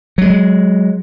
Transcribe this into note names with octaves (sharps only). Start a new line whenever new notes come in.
F#3 G#3